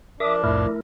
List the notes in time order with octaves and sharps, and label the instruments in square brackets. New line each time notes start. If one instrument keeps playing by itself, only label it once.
[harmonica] F3 D4 D5 [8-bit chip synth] A#4 [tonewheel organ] E5 D6 D#6
[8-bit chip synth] C2 F2 A2 [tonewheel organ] A3 E4 A#4